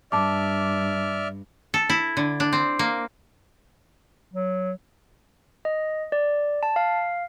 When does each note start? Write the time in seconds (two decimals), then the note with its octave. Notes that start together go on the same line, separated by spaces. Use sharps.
0.12 G2 D5 E5 A5 D6 F6
1.74 A4
1.90 E4
2.17 D3
2.40 D4
2.53 C4
2.79 A#3
4.34 F#3
5.65 D#5
6.12 D5
6.63 A5
6.76 F5